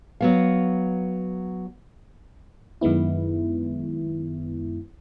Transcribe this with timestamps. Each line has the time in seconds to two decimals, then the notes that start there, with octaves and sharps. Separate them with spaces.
0.21 F#3 B3 F5
2.81 F#2 D#3 G#3 B3 E4